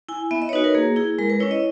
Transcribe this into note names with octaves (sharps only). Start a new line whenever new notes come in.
E4 G#5
B3 E5
D#5
C#5
D#4 F#4 B4
A#4
A#3 G#4
E4 G#4
G#3 A#4
B4
C#4 E4 C#5
D#5